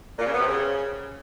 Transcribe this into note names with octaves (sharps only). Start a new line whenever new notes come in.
A#2
C#3
B3
C3
C#3